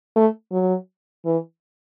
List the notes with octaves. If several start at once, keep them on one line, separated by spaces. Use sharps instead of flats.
A3
F#3
E3